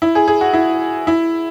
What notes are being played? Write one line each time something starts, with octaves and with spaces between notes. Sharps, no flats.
E4
G#4
G#4
F#4
E4
E4